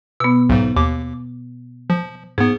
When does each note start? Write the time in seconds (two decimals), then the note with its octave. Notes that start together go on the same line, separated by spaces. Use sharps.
0.20 B2 B3 E6
0.50 B1 G#2
0.77 D#2 D6
1.90 F3
2.38 G#2 B3 G#4